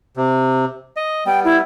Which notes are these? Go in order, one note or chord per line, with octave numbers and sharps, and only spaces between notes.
C3
D#5
G3 B3 G5
E4